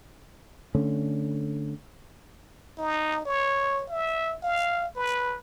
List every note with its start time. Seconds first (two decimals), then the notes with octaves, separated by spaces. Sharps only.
0.75 D3 A3 C#4
2.78 D#4
3.26 C#5
3.90 E5
4.43 F5
4.96 B4